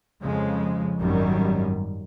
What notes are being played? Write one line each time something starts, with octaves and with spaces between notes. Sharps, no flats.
F2 C#3 F3 G#3
G#1 F#2 D#3 G3